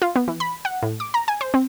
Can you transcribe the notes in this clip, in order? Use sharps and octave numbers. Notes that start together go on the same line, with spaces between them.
F4
B3
E3
B5
F#5
A2
D6
A#5
G#5
C5
C4